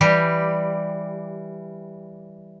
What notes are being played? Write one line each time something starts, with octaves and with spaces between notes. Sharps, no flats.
E3 G3 G4